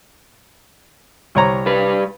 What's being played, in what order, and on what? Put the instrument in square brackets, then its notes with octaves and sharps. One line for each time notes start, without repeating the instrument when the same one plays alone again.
[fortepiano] C2 C#5 A#5
[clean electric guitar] G3 B4